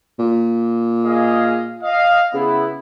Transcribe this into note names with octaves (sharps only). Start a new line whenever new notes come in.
A#2
G#4 D#5 F5
D#5 F5
C#3 B3 E4